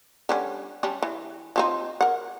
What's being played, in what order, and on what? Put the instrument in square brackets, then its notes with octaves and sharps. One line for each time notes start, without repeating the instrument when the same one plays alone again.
[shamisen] D3 G3 C#4
G3 C#4 D4
E3
F3 C4 D#4
A#4 F#5